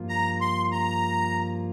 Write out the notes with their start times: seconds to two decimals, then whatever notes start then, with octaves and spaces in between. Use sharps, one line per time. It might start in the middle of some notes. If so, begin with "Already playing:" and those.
Already playing: G2 F3 A#3 F4
0.09 A#5
0.41 C6
0.72 A#5